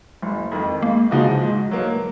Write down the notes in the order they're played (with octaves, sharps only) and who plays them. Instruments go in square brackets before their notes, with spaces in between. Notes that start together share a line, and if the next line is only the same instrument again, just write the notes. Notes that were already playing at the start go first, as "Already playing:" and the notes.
[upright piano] F#1
F2 D#3
[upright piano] G#2 [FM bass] A#3
[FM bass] C#3 [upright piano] F3 G#3 D#4 F#4
[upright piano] G#2
F#3 A#3